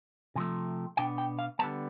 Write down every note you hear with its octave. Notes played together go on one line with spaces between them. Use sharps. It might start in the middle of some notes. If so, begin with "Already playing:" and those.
C3 F3 A3
B2 B3 D4 G5
G5
F5
D3 G3 B3 A5